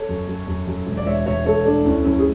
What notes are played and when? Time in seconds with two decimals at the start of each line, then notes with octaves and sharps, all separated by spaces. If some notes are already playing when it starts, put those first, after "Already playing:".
Already playing: A4 C#5
0.09 F#2
0.27 F#2
0.47 F#2
0.67 F#2
0.87 E1
0.97 D5
1.06 E1 C#5 E5
1.26 E1 C#5 E5
1.45 E1 A4 C#5
1.65 A3 D4
1.85 D2 C#4 E4
2.04 F#2 C#4 E4
2.19 G#4